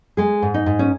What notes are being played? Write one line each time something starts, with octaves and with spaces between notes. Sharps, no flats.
G#3 G#4
G#2
D#4
G#2
C#4